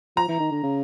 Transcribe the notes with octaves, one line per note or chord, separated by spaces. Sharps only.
F3 A#5
E3
D#3
D3
C#3